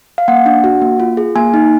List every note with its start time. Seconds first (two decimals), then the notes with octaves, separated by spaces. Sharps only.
0.18 F5
0.28 A#3 F#5
0.46 D4
0.64 F#4
0.82 A#3
1.00 F4
1.17 G#4
1.36 A#3 G#5
1.54 D#4